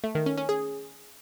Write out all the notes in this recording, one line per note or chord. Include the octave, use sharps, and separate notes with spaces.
A3
D#3
C#4
C#4
G#4